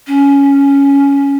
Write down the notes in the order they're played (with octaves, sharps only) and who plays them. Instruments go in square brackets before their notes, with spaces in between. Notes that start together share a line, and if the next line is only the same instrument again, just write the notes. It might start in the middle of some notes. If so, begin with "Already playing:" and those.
[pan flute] C#4